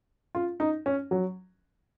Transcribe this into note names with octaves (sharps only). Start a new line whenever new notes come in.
F4
D#4
C#4
F#3